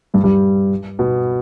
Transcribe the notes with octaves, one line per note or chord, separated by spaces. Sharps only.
G2 G3
G2 G3
B2 B3